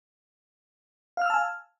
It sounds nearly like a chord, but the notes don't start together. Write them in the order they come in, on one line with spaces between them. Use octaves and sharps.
F5 F6 E6 A5 G#5